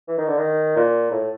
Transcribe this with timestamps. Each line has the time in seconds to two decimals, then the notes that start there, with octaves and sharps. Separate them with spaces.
0.08 E3
0.18 D#3
0.28 D3
0.38 D#3
0.76 A#2
1.11 A2